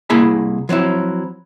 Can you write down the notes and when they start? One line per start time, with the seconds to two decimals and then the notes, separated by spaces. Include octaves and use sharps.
0.10 C2 A#3 E4 G#4 A#5 B5
0.69 F3 F#3 C4 E4